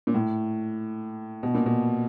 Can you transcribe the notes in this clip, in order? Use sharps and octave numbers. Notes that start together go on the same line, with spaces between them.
A#2
A2
B2
A#2
B2